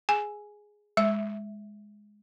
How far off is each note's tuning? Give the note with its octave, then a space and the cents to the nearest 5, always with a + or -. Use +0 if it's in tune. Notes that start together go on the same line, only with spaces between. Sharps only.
G#4 +0 G#5 +5
G#3 +0 E5 +0